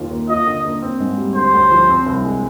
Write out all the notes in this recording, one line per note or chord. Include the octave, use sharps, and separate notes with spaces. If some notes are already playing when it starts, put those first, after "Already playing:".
Already playing: D#2 F4
A#3
F4 D#5
D3
A#3
C4
G#2
G3
D2 C5
D2
F3
C4
C2
G#3